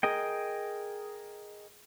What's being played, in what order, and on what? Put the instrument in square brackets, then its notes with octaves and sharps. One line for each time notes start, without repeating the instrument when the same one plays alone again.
[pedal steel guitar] G#4 A#4 D#5 G5